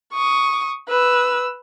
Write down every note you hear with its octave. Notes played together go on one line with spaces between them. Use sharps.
C#6 D#6
B4 E6